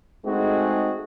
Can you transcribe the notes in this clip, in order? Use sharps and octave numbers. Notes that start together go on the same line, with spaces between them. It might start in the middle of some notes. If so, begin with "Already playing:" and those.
G#3 A3 C4 D#4 F#4 G#4